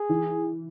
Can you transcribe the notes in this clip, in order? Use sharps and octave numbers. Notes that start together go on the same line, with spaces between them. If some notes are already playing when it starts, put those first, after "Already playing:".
Already playing: G#4
E3